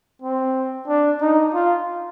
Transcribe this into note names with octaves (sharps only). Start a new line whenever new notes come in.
C4
D4
D#4
F4